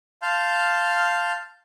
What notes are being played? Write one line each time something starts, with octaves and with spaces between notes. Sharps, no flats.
F5 A5 C6 F6 G6